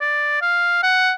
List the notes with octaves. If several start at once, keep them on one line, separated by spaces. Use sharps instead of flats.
D5
F5
F#5